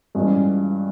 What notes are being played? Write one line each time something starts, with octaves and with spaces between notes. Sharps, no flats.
G2 E3 G#3 C#4 F4